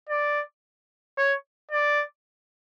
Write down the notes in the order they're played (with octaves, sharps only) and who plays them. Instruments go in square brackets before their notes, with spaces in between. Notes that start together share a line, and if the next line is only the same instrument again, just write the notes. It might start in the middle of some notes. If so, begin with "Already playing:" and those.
[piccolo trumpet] D5
C#5
D5